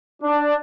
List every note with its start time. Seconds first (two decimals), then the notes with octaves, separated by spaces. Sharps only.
0.22 D4